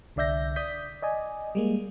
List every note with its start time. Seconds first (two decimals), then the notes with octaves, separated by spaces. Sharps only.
0.16 C2 D3 D5 E5 G6 A#6
0.56 D5 D#6 G6 B6
1.02 D5 D#5 G#5
1.55 G3 G#3 A#3